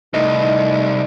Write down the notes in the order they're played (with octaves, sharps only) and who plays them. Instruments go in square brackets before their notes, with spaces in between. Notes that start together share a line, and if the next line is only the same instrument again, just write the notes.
[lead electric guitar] C2 [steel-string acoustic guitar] A3 E4 D#5 [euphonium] D#4